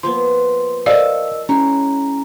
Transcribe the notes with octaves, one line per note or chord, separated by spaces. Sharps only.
F3 A#3 B3 C6
A4 A#4 C5 D5 D#5 F5 A5 E6
G#3 C#4 E4 C#5 A#5